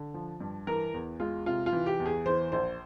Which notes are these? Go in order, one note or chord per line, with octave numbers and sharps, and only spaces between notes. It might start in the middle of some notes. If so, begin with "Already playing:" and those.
Already playing: D3
F3
G2
E3 A#4
E2
G#3 F4
C3 F4
F4
E3
G4
E2
G#4
E3 C5
A#1 C5